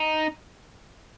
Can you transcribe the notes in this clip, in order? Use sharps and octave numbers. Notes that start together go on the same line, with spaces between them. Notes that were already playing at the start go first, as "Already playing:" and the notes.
Already playing: D#4